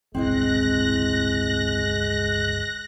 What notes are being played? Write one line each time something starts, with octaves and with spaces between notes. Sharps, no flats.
G1 C#2 G#3 C4 E4 D#5 F#6 A#6